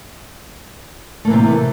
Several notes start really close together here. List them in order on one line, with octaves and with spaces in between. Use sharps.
A3 A#3 E3 C3